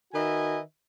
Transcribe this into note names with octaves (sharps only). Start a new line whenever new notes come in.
D#3 F#4 B4 D#5 E5 G#5